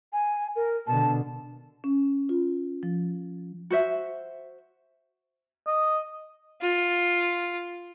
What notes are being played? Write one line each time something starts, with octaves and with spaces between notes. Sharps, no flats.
G#5
A#4
B2 D3 A5
C#4
F4
F3
F#4 C5 E5
D#5
F4